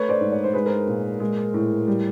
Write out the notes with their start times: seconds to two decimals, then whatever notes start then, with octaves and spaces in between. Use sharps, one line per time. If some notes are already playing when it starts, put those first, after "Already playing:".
Already playing: A3 B4 C#5
0.09 C5 D5
0.21 G#2
0.32 C#5
0.44 C5
0.54 G#3 B4
0.66 A#4 C5
0.88 A#2
1.20 G#3
1.54 A2
1.87 G3